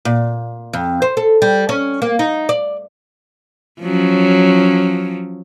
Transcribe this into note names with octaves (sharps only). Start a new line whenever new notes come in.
A#2
F2
C5
A4
G3
C#4
A#3
D#4
D5
F3 F#3 C#4